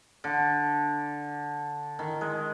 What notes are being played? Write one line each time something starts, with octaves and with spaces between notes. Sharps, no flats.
D3
D#3
G#3